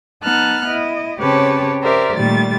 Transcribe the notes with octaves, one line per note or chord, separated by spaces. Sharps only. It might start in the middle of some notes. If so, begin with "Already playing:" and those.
B3 D#4 A5 F6 F#6
E4 D#5
C#3 C4 G4 B4 C#5 A5
G4 A#4 C5 D5 E5
A#2 D#3 G3 A3 A6